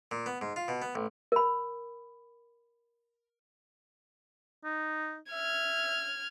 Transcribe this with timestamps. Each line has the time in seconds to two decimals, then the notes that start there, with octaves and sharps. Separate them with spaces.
0.11 A#2
0.26 B3
0.41 G#2
0.56 F4
0.68 B2
0.82 B3
0.95 A1
1.32 A#4 B5
4.64 D#4
5.32 E5 F6 G#6